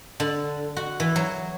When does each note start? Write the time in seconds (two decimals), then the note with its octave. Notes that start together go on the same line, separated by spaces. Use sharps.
0.20 D3
0.77 F#4
1.00 E3
1.16 F#3